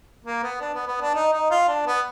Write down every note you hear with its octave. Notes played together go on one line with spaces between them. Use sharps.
A#3
B3
D4
B3
B3
D4
D#4
D#4
F4
D4
B3